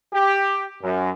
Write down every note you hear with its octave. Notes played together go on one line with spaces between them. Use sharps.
G4
F#2